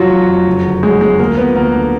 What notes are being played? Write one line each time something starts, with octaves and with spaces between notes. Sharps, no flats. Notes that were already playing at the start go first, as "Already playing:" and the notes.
Already playing: F1 F3 F#3 F4 F#4
F1
F2
F#1
D3
F#3 G#3 G#4
F2 G#3 G#4
D2 A#3 A#4
F3 B3 B4
D2 A#3 A#4
D3